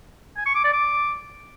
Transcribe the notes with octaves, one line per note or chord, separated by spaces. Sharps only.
G#5
C#6
D6
D5
D6